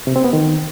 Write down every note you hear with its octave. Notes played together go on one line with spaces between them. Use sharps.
C3
C4
B3
D#3